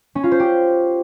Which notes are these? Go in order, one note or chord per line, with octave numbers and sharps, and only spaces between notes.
C#4
F4
C5
G4